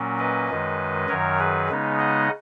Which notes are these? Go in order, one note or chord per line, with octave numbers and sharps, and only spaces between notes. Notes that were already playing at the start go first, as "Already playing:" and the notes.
Already playing: A#2 F#3 A#3 C#4
B4 D#5
F#2 D#3 G#3
F#2 D#3 F#3 A#4 C#5
G#4 B4
C#3 G#3 B3 D#4
D#5 F#5